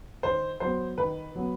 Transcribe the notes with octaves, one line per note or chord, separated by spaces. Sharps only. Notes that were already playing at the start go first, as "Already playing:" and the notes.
D#3 C5
F#3 B3 C5
D#3 B4
F#3 B3